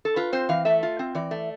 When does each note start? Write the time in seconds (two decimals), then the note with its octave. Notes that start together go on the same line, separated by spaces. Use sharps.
0.05 A4
0.16 F4 B4
0.33 C4 C5
0.49 E3 F5
0.65 A3 E5
0.83 F4
0.99 C4
1.15 E3 D5
1.31 A3